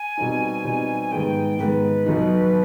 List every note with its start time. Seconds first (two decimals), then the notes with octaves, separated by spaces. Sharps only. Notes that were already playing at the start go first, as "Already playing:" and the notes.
Already playing: G#5
0.18 B2 G3 C4 D#4
0.64 B2 G3 C4 D#4
1.12 G#2 D#3 G#3 B3 G5
1.58 G#2 D#3 G#3 B3 B4
2.06 B1 B2 B3 D#4